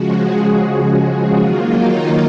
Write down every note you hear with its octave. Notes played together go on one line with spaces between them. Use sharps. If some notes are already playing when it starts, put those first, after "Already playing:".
Already playing: C#3 F3 G#3 F#4
G#4
F#4
D#3 F#3 A#3 F4
D#4